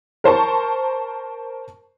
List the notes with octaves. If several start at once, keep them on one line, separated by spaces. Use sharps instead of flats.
A#4 C5 A5 C#6